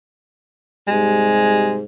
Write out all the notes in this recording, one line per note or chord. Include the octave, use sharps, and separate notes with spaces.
G#2 C3 G3 G#3